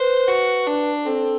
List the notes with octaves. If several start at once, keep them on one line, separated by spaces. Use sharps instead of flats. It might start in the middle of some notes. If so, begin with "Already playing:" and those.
Already playing: B4 C5
F#4
D4
C4 A4